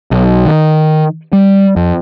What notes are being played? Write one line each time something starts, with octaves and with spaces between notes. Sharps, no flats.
B1
D#3
G3
F2